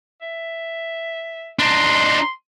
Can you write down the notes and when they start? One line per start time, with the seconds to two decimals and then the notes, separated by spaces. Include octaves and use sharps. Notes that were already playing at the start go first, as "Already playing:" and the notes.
0.22 E5
1.59 D4 D#4 C6